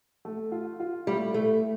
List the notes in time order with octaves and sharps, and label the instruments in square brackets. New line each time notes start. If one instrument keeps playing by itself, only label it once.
[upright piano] A3
F4
F4
[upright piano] A2 [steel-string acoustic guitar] G3
[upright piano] A2 [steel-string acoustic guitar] A3